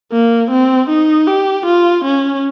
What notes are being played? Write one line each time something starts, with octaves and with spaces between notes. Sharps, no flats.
A#3
C4
D#4
G4
F4
C#4